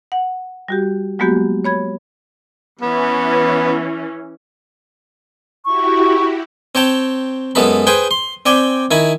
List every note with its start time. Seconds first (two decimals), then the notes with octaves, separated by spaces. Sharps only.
0.12 F#5
0.68 G3 F#4 G4
1.19 F#3 G#3 A#3 B3 F#4 G4
1.64 C#5 B5 G#6
2.81 E3 B3 C#4
5.65 E4 F#4 G4 C#6
6.75 C4 C#5 G5 A5
7.55 F#2 G#3 B3 A4 B5
7.87 G#4 B4 C5 G5 G#5
8.11 C6
8.46 C4 D5 G5 G#5
8.91 D#3 E4 G#5 B5